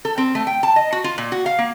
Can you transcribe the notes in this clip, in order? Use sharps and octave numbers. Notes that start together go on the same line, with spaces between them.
A4
C4
A3
G5
A5
D#5
F#4
F4
A#2
F#4
F5
A#3